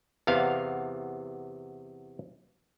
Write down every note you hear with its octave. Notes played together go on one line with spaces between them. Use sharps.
E2 C3 B3 F5